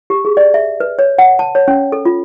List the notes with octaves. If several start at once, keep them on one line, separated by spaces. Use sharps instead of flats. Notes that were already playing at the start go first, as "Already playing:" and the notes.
G4
G#4
D5
E5
B4
C#5
F#5
A5
C#5
C#4
A4
F4